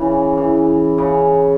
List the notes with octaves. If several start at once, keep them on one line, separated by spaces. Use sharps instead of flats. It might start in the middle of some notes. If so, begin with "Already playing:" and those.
Already playing: C#3 E3
E3
C#3